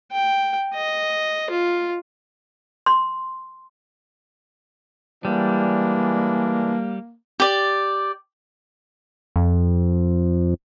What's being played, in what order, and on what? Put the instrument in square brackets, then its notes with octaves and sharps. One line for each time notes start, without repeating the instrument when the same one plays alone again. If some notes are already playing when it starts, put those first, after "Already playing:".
[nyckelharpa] G5
D#5
F4
[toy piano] C6
[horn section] E3 G#3 D4 [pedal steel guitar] G3 [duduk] A#3
[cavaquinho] G4 D5
[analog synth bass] F2